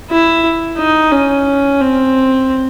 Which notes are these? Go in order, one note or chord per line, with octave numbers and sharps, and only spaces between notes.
E4
D#4
C#4
C4